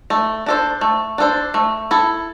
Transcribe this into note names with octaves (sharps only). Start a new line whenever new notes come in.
A3
D4 A4 C5
A3
D4 A4 C5
A3
E4 A4